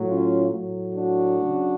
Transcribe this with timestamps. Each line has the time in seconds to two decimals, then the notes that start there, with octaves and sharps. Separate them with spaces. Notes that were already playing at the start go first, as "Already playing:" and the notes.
Already playing: A2 F#3
0.08 C#4 F4
0.51 A2 F#3
0.95 D4 F#4
1.37 C#3 F#3